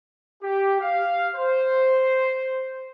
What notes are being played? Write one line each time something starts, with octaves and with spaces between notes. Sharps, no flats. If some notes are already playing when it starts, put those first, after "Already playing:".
G4
F5
C5